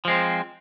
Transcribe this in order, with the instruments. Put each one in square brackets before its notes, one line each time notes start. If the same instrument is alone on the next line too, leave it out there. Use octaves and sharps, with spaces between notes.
[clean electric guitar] F3 G#3 C4